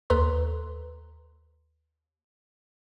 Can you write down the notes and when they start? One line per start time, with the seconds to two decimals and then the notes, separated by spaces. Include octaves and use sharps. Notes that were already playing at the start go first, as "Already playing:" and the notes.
0.10 D#2 A4 B4 A#5 C6